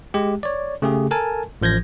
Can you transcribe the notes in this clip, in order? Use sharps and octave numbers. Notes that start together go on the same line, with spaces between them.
G#3 G4
C#5 D5
C#3 A3 G4 G#4
A4 A#4 G#5 A5
A1 F3 G6 G#6 A#6